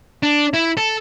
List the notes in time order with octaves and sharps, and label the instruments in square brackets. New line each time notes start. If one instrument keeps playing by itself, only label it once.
[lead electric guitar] D4
E4
A4